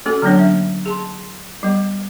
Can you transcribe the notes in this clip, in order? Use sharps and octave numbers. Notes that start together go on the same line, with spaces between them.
A#3 C#4 F#4 A4
D3 F#3 A#3 B3 D4 C#5
E5
G#4 A5 C6
G3 B3